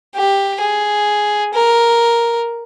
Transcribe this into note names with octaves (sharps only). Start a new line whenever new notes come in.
G4
G#4
A#4